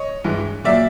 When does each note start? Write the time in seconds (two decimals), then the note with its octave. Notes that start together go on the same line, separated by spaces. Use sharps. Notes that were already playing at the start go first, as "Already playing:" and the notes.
Already playing: C#5 D#5
0.24 G2 E3 G#3
0.64 A#2 F#3 A#3 D5 E5